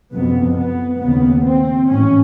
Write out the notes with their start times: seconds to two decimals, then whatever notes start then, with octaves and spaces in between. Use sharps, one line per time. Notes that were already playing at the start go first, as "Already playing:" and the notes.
0.13 F#1 F2 C3 B3
0.58 B3
1.01 F1 D#2 C#3 B3
1.46 C4
1.89 A1 G#2 C#4